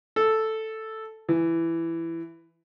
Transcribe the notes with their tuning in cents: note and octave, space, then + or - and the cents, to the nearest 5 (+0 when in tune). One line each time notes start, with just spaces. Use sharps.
A4 +0
E3 +10